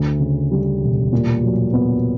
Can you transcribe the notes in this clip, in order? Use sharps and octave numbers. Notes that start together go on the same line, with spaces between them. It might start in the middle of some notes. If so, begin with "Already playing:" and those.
Already playing: D2
C#3
G3
E1
A#2
F#3
B3